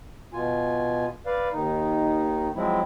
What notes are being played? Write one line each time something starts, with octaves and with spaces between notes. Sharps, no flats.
B2 F4 G#5
B4 D5 F5
D#2 D#3 D#4
F3 F#3 G#3 C4 E4